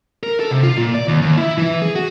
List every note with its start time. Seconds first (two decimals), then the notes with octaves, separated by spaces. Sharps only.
0.23 A#4
0.40 A4
0.51 C3
0.63 F4
0.77 A#2
0.94 D5
1.08 D#2
1.21 D#2
1.38 E4
1.58 E3
1.82 G#4
1.95 F#4